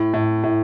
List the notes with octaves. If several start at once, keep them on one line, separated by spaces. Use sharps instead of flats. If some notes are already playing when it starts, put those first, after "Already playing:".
Already playing: A2
A2
A2